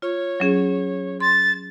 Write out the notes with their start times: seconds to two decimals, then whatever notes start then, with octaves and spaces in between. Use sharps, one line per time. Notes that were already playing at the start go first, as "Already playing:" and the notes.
0.02 F4 C#5
0.40 F#3 C#4 G#4
1.20 C6 A6